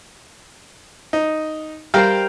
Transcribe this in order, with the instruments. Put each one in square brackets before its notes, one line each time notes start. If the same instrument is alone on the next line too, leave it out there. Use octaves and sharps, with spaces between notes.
[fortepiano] D#4
[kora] G3 A#4 C5 [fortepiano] F5 G5 A#5